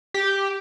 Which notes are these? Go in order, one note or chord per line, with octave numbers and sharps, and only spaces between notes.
G4